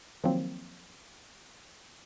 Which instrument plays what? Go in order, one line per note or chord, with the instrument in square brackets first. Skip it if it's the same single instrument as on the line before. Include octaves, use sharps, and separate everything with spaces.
[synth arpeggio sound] D#3 F3 F#3 A#3 C4